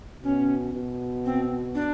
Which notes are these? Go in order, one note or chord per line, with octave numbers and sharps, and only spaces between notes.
B2 C#4
B2
C4
D4